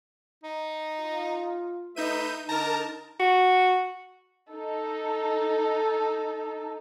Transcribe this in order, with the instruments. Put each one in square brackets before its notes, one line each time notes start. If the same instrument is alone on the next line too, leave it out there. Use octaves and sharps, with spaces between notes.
[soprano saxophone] D#4
[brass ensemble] F4
[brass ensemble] A3 B4 [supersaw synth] D#4 G6 D#7 [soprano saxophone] E5
[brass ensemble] D3 D#4 [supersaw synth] A#4 A5 [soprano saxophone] A#5
[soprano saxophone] F#4
[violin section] D#4 A4